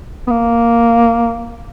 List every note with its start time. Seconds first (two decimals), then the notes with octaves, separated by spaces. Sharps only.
0.27 B3
0.31 A#3